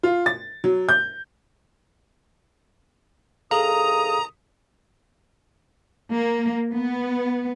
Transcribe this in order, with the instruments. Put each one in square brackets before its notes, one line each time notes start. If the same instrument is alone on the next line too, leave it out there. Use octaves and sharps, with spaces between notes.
[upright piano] F4
A6
F#3
G6
[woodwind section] C2 D#3 D#6 [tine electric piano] G#4 A4 F5 [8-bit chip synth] A#5
[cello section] A#3
B3